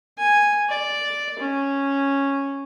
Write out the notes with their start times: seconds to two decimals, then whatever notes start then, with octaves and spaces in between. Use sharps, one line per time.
0.18 G#5
0.69 D5
1.39 C#4